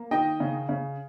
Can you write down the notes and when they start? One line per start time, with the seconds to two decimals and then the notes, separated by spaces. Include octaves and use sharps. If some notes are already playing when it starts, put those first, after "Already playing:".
Already playing: A#3
0.11 D#3 D#5 G5
0.40 C#3
0.69 C#3